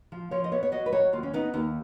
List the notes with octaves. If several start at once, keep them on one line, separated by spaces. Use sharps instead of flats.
F3
F3 C#5
D#5
B3 C#5
C#5
F#3 D#5
B4
F#3 C#5
D#2 F4
C#4
B3 D#4
D#2 D#4